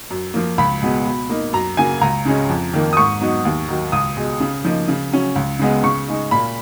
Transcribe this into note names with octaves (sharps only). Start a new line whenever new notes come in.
F#2
F3 A#3
C#2 B5
B2 G#3 B3
B2
A#3 D#4
F#2 A#5
C#3 F#3 A#3 G#5
C#2 A#5
C#3 G#3 C#4
F2
D#3 A#3
D#6
G#2 C#6
F#3 B3 D#4
D#2
D#3 F#3
C#2 D#6
B2 G#3
C#3
F3 A#3 D#4
C#3
F#3 C#4
C#2
C#3 G#3 B3
C#3 C#6
G#3 D#4
A#2 B5